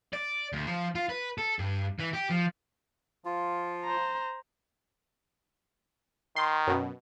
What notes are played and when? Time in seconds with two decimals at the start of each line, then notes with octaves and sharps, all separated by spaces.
0.13 D5
0.53 D2
0.67 F3
0.95 F4
1.09 B4
1.38 A4
1.59 G2
2.00 E3
2.14 G4
2.31 F3
3.25 F3 F4
3.84 C5 A#5
6.36 D#3 C6
6.67 F#2 B2